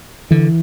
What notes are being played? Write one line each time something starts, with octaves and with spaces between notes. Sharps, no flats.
D3 E3